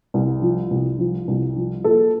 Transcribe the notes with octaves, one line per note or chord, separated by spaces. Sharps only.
C2
F3
C2
F3
C2
F3
A#2 A4